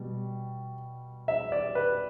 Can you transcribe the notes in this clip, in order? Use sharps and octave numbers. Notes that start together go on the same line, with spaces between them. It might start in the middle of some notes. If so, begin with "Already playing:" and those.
Already playing: B2 G3
E5
D5
B4